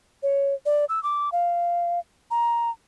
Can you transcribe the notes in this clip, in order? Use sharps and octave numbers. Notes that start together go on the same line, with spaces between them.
C#5
D5
E6
D6
F5
A#5